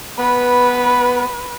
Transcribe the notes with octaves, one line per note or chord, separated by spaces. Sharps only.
B3 B4